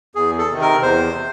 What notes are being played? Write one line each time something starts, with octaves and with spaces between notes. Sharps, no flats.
E2 G#4
A4
C3 D#3
A#4
E2 C5
C3